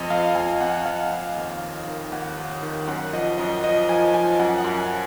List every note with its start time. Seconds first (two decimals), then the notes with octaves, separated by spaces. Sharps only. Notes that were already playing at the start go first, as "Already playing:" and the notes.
Already playing: F2 D#5
0.10 F2 F5
0.35 F2 G#5
0.60 F2 F#5
0.75 F#5
0.86 F2 F5
1.11 F2 F5
1.37 D#2
1.62 D#2
1.87 D#3
2.12 D#2 F#5
2.37 D#2
2.50 F#5
2.63 D#3
2.88 F#2 F#5
3.13 F3 D#5
3.38 F#2 D#5
3.63 F3 D#5
3.89 F3 G#5
4.14 F3 G#5
4.39 F#2 F#5
4.58 F#5
4.64 F#2
4.77 G#5